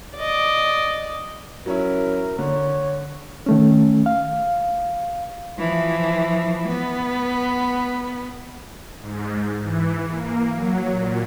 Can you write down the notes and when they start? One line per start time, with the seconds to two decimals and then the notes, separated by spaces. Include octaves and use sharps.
0.17 D5 D#5
1.66 F#3 C#4 E4 A#4
2.39 D3 C#5
3.46 D#3 A3 C#4
4.06 F5
5.58 E3 F3
6.68 B3
8.99 G#2
9.62 E3
10.10 A#3
10.51 F#3
10.90 A#2